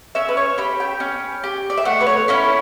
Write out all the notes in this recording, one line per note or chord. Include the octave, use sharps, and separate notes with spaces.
C#4 E5
B4
C#5
G4 B5
G5
C#4
G4
D5
E5
A3 F#5
B4
C#5
C#4 E4 B5